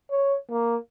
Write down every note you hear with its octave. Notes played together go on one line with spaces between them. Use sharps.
C#5
A#3